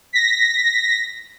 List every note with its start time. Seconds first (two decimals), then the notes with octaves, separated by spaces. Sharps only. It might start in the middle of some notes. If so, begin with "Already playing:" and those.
0.13 A#6 B6